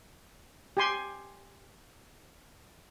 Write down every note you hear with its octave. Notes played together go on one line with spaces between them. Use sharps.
G4 G#5 C6